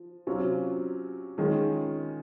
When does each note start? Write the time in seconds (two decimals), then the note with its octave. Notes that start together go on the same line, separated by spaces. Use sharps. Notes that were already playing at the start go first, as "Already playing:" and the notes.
Already playing: F3
0.27 C3 F#3 C#4 F4
1.38 D#3 G#3 C#4 F4